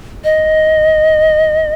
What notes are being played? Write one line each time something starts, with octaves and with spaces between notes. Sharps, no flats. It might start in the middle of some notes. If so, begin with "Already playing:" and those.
D#5